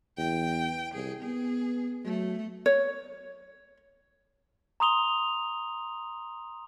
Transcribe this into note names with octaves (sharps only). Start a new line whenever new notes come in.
E2 G5
C2 G#4
B3 G#4
F#3 A3
C#5
A#5 C6 D#6 F7 G7